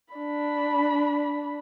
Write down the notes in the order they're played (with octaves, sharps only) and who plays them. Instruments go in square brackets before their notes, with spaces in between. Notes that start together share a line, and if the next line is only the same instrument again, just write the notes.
[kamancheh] D4 B5